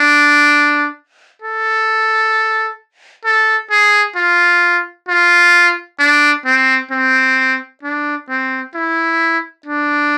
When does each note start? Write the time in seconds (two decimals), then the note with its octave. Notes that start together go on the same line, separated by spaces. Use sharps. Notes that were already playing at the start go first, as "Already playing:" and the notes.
Already playing: D4
1.42 A4
3.25 A4
3.71 G#4
4.17 F4
5.09 F4
6.00 D4
6.46 C4
6.91 C4
7.83 D4
8.29 C4
8.74 E4
9.66 D4